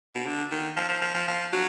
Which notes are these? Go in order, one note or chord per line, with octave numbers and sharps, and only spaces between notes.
B2
D3
D#3
F3
F3
F3
F3
F3
F#3